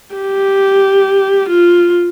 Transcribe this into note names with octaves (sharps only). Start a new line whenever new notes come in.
G4
F4